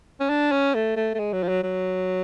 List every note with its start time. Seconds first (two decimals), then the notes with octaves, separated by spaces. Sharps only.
0.20 C#4
0.30 D4
0.52 C#4
0.75 A3
0.96 A3
1.15 A3
1.19 G#3
1.33 F#3
1.43 F3
1.48 F#3
1.64 F#3